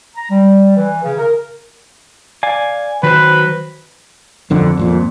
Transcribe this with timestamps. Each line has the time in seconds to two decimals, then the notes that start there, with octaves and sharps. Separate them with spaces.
0.16 A#5
0.30 G3
0.76 E3
1.04 C#3
1.18 A#4
2.43 D5 F5 G#5
3.03 D#3 F#3 B4 C5
4.50 G1 F2 D3
4.77 G#1 F2 A#2